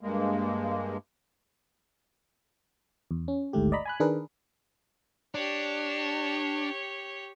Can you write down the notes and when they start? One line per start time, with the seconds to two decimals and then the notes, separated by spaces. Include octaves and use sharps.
0.01 G2 G#3 A#3
3.11 E2
3.28 C#4
3.53 G#1 D2 G#2 A3 G4
3.72 D5 D#5 A#5 B5
3.85 G#5 B5 F#6
4.00 D#3 D4 G#4 A#4 B4
5.35 D4 G4 C#5